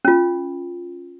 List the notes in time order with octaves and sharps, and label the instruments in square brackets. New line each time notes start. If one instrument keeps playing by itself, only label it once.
[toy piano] C#4 F4